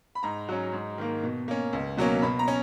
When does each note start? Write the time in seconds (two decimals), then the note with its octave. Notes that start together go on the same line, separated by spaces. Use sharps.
0.15 B5
0.23 G#2 A#5
0.49 F#3 C#4
0.73 G#2
0.98 D#3 A#3
1.23 B2
1.48 A#3 C#4
1.73 C#2
1.97 B2 F#3 A#3 C#4
2.22 B2 B5
2.39 A#5
2.48 C#4